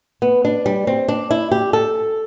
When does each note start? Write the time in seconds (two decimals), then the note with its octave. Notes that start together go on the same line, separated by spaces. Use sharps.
0.22 B3
0.45 D4
0.66 G3
0.87 C4
1.08 D4
1.31 E4
1.51 G4
1.73 A4